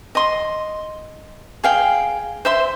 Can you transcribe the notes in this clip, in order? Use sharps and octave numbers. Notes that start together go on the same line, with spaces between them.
D#5 C6
G#4 F5 G5
C5 E5 C6